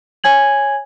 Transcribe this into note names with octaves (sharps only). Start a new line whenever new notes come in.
C#5 G#5 G#6 F#7